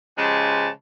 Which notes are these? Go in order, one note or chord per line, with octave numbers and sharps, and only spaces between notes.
C#3 F3 G#3 G4 A5